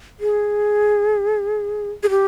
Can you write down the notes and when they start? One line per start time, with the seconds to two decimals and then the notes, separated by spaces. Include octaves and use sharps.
0.20 G#4
2.03 G#4
2.10 G4